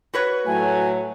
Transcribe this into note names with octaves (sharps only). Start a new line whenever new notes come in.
F#4 B4 C#5
A2 F#3 A3 G#5